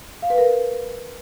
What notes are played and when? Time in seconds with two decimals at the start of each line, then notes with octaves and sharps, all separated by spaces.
0.22 F5
0.30 B4
0.38 A#4